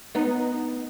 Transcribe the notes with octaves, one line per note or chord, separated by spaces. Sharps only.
B3 D#4